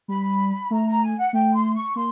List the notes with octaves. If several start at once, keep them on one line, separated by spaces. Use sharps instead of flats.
G3 B5
A3 A#5
A#5
G#5
F#5
A3 G5
C6
C#6
A#3 C6